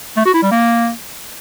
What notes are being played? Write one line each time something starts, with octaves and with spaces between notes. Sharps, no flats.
A3
F#4
E4
G3
A#3